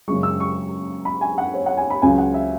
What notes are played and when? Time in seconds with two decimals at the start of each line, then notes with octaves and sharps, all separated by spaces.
0.08 F#2 C#3 G#3 C#6
0.23 E6
0.40 C#6
1.05 B5
1.21 G#5
1.38 F#5
1.54 C#5
1.66 F#5
1.77 G#5
1.90 B5
2.02 C#2 C#3 F#3 G#5
2.18 F#5
2.34 E5